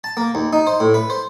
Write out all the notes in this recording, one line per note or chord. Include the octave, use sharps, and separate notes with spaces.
A5
A#3
D#2
D#4
C5
A2
B4
C5